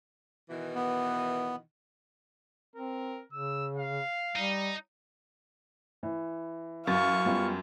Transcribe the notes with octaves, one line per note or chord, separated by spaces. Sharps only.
B2 D#3 E3
B3
C4 A#4
C#3 E6
F5
G3 D#4
E3
F#2 F5 C#6 A6
G3 B3 F4